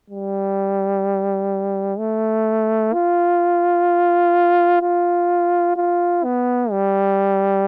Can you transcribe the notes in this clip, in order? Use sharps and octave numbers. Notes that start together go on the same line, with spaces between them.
G3
A3
F4
F4
F4
B3
G3